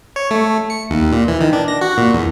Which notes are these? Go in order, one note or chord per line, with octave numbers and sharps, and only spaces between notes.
C#5
A3
C#7
D#2
A#2
E3
D#3
D4
A#6
F#4
A#2
E2